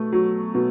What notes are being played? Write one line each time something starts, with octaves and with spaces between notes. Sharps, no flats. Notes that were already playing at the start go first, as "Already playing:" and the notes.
Already playing: B2 A3
F#3
B2